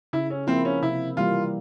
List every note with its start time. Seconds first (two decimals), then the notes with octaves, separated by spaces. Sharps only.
0.13 C#3 E4
0.30 C#4
0.47 F3 A#3 C4 E4
0.65 C#4
0.82 C3 E4
1.17 E3 G3 A#3 F4